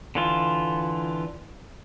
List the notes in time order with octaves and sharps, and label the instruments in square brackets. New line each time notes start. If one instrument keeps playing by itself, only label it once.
[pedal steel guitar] D3 E3 F4